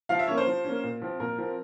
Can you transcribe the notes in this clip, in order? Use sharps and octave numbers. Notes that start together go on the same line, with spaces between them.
F3 F5
E5
A#3 C#4 C#5
C5
F3
A#3 C#4
A#2
F3 C4
A#2 A#4
F3 C4